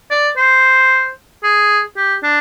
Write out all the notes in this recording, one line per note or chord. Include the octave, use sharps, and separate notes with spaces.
D5
C5
G#4
G4
D4